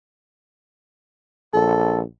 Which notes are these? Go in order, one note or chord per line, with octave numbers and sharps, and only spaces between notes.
A#1 A4